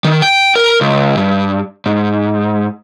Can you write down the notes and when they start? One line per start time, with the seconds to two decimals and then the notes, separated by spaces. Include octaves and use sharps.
0.05 D#3
0.22 G5
0.56 A#4
0.81 C#2
1.17 G2
1.86 G#2